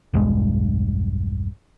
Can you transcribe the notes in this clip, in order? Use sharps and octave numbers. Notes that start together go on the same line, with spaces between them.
E1 B1 G2 G#3